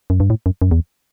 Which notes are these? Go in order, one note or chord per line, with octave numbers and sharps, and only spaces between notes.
F#2
G2
A2
F#2
F#2
E2